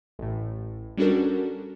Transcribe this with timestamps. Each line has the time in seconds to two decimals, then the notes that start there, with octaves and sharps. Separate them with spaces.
0.19 A1 A2
0.97 G3 C#4 D4 F#4 A4 A#4